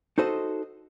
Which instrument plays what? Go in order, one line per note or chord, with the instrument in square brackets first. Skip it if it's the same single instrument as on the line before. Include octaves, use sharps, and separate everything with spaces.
[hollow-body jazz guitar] D#4 F#4 A4 C5 D#5